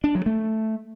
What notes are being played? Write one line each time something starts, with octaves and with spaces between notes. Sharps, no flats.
D4
F#3
A3